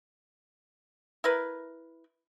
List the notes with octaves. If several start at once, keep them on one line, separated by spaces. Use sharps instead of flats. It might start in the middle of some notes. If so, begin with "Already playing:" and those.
E4 A#4 B4